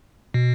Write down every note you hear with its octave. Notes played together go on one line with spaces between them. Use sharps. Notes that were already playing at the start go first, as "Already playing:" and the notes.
B2